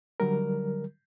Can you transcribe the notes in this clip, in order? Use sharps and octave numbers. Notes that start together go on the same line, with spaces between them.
D3 F#3 G3 A#4